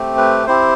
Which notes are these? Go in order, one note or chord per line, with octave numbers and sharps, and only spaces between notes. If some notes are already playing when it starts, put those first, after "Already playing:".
Already playing: A3 C4 G4
B4
C4 E4 G4 C5